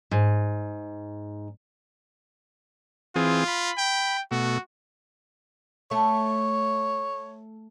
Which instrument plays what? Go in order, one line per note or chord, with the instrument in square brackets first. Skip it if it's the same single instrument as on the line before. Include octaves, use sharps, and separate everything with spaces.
[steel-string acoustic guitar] G#2
[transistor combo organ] E3 C4 G#4 [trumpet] F4
[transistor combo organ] B5
[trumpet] G5
[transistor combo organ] B2 A3 [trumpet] F#4
[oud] A3 [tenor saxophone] C#5